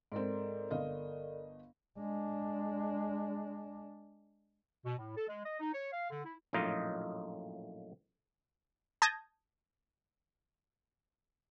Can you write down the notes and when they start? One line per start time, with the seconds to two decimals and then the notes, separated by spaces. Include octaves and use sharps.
0.12 G#2 C4 A4 A#4 D5
0.70 G1 D#5 F5
1.99 G#3 D4
4.86 B2
4.98 A2
5.16 A4
5.29 G#3
5.45 D#5
5.60 D#4
5.73 C#5
5.92 F5
6.10 D3
6.25 E4
6.53 A#1 F#2 A2 D#4 F4 D#5
9.02 A5 D#6 G6 G#6 A#6